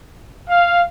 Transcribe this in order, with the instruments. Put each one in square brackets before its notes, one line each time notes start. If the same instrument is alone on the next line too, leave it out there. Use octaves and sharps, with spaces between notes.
[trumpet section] F5